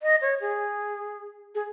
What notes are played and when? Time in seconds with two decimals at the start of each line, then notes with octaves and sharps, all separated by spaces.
0.02 D#5
0.21 C#5
0.41 G#4
1.55 G#4